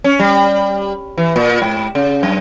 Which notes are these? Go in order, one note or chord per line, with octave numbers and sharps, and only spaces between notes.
C#4
G3
E3
A#2
G#2
C#3
F#2